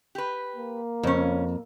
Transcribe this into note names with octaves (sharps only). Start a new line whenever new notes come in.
G4 B4
A#3
F2 C#3 C#4